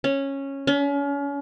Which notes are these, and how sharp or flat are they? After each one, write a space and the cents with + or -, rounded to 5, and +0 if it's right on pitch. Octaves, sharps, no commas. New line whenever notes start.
C#4 -10
C#4 +35